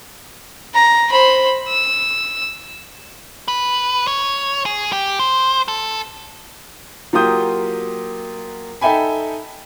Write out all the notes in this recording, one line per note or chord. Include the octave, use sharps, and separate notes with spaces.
A#5
C5 B5
E6
B4
C#5
G#4
G4
C5
A4
F#3 A#3 F4 G4 D#6 G6
D#4 A4 E5 G5 G#5 B5